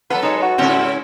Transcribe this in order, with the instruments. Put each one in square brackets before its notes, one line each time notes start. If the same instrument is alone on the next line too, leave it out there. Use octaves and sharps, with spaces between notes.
[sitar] F#3 A4 B4 [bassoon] B3 [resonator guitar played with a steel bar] F4
[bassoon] G#3 [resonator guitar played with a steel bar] D#4 C#5
[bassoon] F#4
[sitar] G#2 C#3 E4 [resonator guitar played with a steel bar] G3 C4 C#4